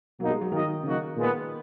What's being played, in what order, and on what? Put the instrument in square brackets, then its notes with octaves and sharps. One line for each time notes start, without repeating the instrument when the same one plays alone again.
[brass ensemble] B2 A#3 D#4 [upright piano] F#3
[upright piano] G#3
F#3
[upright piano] D#3 [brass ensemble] F#3 A#3 D#4 A#4 D#5
[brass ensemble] C#3 F#3 A#3 D#4 F#4
A#2 G#3 B3